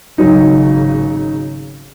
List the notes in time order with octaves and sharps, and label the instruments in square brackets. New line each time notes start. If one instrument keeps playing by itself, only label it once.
[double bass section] G#1 C#3 [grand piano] F#3 D#4